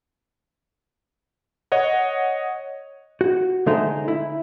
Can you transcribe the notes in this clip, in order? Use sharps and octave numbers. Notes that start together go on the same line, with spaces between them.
C#5 D#5 F#5
F#4
D3 G#3 A3 D#4 G#4 C5
E4